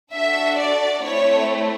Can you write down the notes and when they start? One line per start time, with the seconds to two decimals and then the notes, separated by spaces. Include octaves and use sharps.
0.13 D4 F#4 A4 E5
0.59 D5
1.03 A3 C4 E4 C#5